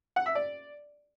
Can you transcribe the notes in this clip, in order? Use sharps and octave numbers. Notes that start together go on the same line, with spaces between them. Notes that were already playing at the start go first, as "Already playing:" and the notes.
F#5
E5
D5